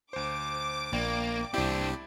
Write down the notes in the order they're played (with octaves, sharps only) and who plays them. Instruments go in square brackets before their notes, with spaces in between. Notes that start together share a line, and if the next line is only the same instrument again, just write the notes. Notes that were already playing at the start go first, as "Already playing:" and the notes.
[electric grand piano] D2 C5 [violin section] D6
[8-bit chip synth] A#1 [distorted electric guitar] A#3 [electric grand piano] D5 G5
[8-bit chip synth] C2 G4 [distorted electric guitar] C4 D4 [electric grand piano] E4 D5